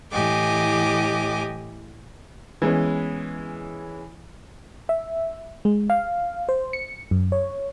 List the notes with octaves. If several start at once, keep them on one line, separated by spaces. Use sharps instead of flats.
A2 E3 G4 D#5 G#5 D6
E3 G#3 B3 C#4
E5
G#3
F5
C5
C#7
F#2
C#5